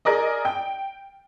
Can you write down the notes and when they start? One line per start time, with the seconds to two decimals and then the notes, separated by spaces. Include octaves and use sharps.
0.05 G#4 A#4 D5 D#5
0.45 G5